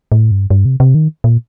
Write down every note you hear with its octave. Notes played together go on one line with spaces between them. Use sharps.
A2
G2
G2
C3
C3
D#3
A#2